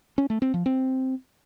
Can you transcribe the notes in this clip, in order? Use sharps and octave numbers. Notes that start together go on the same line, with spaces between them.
C#4
A3
C4
F3
C4